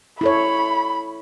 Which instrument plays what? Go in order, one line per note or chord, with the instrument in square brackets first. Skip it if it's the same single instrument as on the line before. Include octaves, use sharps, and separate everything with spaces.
[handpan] E4 A4 C#5 [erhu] B5